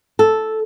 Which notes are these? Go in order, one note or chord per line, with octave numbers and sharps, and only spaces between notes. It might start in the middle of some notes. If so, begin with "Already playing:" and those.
A4